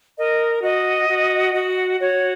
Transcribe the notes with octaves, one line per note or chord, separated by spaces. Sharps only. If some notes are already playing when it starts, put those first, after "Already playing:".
A#4 D#5
F#4 D#5
F#4
F#4
F#4 C#5